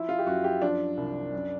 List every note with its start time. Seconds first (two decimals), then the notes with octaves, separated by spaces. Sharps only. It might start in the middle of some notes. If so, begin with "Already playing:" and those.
Already playing: F3 E4
0.09 F4
0.19 G4
0.26 F#2 F#4
0.44 G4
0.62 F3 D4
0.97 C2
1.33 F#2